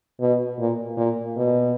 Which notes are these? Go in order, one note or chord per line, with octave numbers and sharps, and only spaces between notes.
B2
A#2
A#2
B2